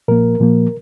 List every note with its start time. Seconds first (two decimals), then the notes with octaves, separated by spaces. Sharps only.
0.08 A#2 F3 A#3 A#4
0.40 A#2 F3 A#3